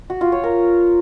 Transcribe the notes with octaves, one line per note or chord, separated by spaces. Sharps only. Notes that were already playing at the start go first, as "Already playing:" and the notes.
F#4
F4
C#5
A#4